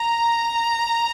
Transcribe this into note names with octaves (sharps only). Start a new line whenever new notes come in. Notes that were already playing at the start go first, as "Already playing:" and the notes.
Already playing: A#5